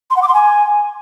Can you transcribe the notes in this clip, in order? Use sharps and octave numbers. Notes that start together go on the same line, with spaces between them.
C6
F#5
D6
C6
G#5